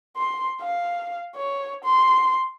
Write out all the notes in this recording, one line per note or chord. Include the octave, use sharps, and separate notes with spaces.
C6
F5
C#5
C6